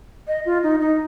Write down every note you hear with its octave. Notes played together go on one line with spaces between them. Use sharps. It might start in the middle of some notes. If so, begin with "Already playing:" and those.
D#5
F4
D#4
D#4